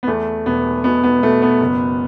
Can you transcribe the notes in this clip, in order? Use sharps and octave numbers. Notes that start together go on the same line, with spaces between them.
B3
E2 A3
E1 B3
B2 B3
B3
B2 A3
B3
F#1